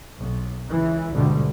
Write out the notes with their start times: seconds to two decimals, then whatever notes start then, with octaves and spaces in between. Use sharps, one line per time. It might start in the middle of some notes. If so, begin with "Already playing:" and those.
0.17 B1
0.69 C#2 E3
1.10 G#1 D2 B2 D3 G3